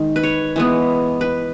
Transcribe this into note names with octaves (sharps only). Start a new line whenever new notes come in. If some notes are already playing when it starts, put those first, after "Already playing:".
Already playing: D#3 G#3
B4
C#5
E3 G#3 B3
B4